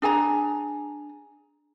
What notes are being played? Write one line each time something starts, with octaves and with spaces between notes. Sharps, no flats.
D4 G#4 G#5 A#5